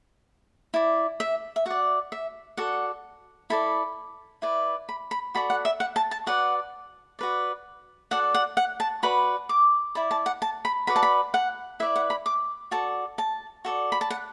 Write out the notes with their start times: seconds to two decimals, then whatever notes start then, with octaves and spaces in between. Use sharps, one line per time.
0.74 E4 D5
1.20 E5
1.56 E5
1.66 F#4 D5 F#5
2.12 E5
2.57 F#4 A4 D5 F#5
3.50 E4 A4 D5 B5
4.42 E4 B4 D5
4.89 B5
5.11 B5
5.35 F#4 A4 D5 B5
5.50 F#5
5.65 E5
5.80 F#5
5.96 A5
6.11 A5
6.26 F#4 B4 D5 F#5
7.19 F#4 B4 D5
8.11 F#4 A4 D5 F#5
8.35 F#5
8.57 F#5
8.80 A5
9.03 F#4 B4 D5 B5
9.49 D6
9.95 E4 D5 B5
10.11 A5
10.26 F#5
10.42 A5
10.65 B5
10.87 F#4 B4 D5 B5
10.96 A5
11.03 B5
11.34 F#5
11.80 E4 B4 D5 E5
11.96 F#5
12.10 B5
12.26 D6
12.71 F#4 A4 D5 A5
13.18 A5
13.65 F#4 A4 D5
13.92 B5
14.01 A5
14.10 F#5